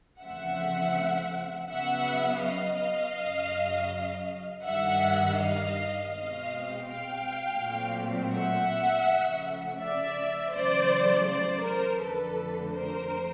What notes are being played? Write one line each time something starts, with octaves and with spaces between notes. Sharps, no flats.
E2 C#3 F3 A3 C4 E5 F#5
C#3 F#3 B3 E5 F#5
D#5 F5
F#2 C#3 F#3
G2 D#3 G3 E5 F#5
D#5 F5
B2 G#3 C4 D#5 F5
F5 G5
A#2 F#3 A3 C4
E5 F#5
C#3 F3 A3
D5 E5
E2 C#3 F#3 A3 C5 D5
C5 D5
A#4 C5
F2 D3 F3 A3 A4 B4
A#4 C5